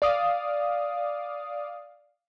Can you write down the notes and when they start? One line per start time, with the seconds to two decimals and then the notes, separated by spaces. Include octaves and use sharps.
0.02 D5 F5 D6 D#6